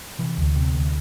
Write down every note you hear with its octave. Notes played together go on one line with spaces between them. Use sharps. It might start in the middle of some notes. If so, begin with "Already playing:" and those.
C3 E3
D2
C3
D2